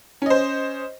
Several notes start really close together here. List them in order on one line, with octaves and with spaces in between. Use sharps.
C#4 D#5 C5